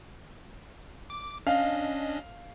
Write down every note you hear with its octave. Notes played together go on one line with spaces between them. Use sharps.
D6
C#4 D4 D#5 F5